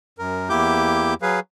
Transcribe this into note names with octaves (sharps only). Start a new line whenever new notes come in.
F#2 A#4
E2 A#3 E4 G4 D6 G6
F#3 G#4 B4 F5